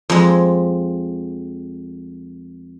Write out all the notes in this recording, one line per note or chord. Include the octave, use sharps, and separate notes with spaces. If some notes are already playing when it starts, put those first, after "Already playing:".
F2 G#3